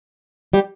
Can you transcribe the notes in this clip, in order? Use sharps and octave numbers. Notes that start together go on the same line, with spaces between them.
G3 G4